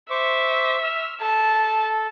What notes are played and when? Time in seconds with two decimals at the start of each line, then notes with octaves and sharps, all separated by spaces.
0.10 C5 E5 C#6 D6
0.83 E6 F6
1.21 A4 A5